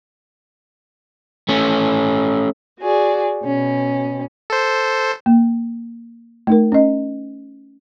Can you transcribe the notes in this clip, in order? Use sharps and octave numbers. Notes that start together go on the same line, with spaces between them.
A3 C#4
F#4 G#4 D5
B2 C#4
A4 C5
A#3
A3 D#4 A#4
C#4 D#5